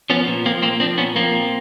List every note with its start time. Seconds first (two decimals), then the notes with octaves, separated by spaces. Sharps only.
0.10 F3 B3 C#4
0.27 A#2
0.45 F3 A#3 C4
0.62 A#2 A#3 C4
0.80 F3 C4 D4
0.97 A#2 B3 C#4
1.16 F3 A#3 C4
1.34 A#2